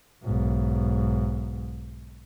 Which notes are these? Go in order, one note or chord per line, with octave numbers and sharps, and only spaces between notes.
B1 G#2